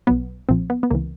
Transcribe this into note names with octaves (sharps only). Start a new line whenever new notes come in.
B1 B2 F#3 B3
B1 A#2 F3 C4
B3
B3
C#2 C3 E3 A#3